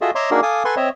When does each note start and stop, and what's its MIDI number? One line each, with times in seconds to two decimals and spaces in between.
0.01 0.11 65
0.01 0.11 66
0.01 0.11 68
0.01 0.11 69
0.01 0.11 75
0.01 0.11 76
0.15 0.30 73
0.15 0.30 75
0.15 0.30 76
0.15 0.30 82
0.15 0.30 84
0.15 0.30 86
0.31 0.41 58
0.31 0.41 62
0.31 0.41 63
0.31 0.41 66
0.31 0.41 68
0.31 0.41 70
0.43 0.63 69
0.43 0.63 77
0.43 0.63 80
0.43 0.63 86
0.43 0.63 87
0.65 0.75 69
0.65 0.75 71
0.65 0.75 78
0.65 0.75 80
0.65 0.75 84
0.65 0.75 85
0.77 0.89 60
0.77 0.89 73
0.77 0.89 75
0.77 0.89 76